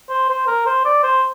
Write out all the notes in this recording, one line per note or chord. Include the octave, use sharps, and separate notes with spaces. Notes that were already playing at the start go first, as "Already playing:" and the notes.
C5
C5
A#4
C5
D5
C5